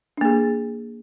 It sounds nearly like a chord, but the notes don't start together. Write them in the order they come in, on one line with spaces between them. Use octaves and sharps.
D4 A#3 G#4